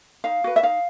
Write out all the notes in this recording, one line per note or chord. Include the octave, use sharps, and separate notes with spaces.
D#4 F5
F#4 B4
E5
D#4 F5